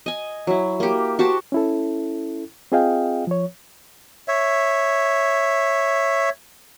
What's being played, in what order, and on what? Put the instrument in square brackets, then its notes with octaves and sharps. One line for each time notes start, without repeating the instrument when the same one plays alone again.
[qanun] D#5 G#5
F#3 E4
A#3 G4
F#4 G4 C5 A5
[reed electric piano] C#4 E4 A4
C4 F4 G#4 D#5 F5 G5
F3 C#5
[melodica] C#5 E5